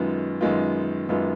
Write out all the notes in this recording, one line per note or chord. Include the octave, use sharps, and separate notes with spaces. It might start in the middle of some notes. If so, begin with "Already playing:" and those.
Already playing: F#2 D#3 G#3 B3 F4
F#2 D#3 G#3 B3 F4
F#2 D#3 G#3 B3 F4